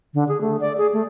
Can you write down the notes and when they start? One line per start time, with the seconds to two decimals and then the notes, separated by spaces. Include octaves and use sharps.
0.14 D3
0.28 G#4
0.41 A3
0.60 D5
0.78 G#4
0.93 A3